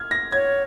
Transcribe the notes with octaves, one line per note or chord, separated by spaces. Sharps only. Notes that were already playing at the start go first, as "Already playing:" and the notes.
Already playing: F6 G#6
A#6
C#5 G#6